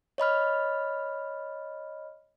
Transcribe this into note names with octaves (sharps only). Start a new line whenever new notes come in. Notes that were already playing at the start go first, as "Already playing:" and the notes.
C#5 D#5 B5 F6